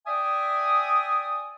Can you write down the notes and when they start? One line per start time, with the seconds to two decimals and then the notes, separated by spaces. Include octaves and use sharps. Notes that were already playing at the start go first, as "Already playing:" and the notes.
0.07 D5 E5 G5 G#5 D#6